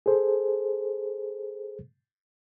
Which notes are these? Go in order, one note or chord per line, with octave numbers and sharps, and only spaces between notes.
G#4 A4 C5